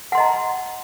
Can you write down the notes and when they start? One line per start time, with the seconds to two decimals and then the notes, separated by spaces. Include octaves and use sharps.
0.12 F#5
0.15 C6
0.18 D#5
0.20 A#5